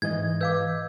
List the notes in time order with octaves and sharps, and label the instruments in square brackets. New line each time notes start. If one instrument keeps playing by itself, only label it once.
[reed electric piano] G#2 E3 D#5 [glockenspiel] G#6
[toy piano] B4 F5 D6 [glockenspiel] E6 G6